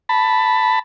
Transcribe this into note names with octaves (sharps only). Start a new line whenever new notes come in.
A5 B5